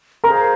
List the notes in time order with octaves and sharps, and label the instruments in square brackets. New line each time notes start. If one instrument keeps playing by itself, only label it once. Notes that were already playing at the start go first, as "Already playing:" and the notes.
[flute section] G#4 C5 F5 [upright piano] A#4 A#5